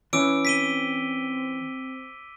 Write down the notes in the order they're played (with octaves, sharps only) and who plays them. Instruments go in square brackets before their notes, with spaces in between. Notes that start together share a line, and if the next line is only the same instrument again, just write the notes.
[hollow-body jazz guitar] E3 C#4 [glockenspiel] D6 E6 D7
[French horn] C4 [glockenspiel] B6 D#7 G7